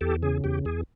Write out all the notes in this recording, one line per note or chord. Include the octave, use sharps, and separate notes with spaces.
E2 G4 A4
C#3 G#4
E2 G4
E2 G#4